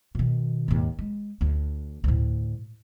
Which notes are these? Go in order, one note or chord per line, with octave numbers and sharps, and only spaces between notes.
B2 D#3
D#2 G#2
G#3
D2 D4
D2 A2